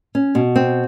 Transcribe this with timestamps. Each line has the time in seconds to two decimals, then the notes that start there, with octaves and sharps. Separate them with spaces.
0.15 C#4
0.35 B2
0.56 C4